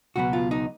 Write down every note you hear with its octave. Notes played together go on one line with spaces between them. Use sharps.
C#2 B2 F#3 B3 F#4
F4
D#4